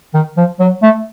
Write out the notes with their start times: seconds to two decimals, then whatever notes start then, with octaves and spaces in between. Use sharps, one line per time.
0.14 D#3
0.37 F3
0.60 F#3
0.83 A3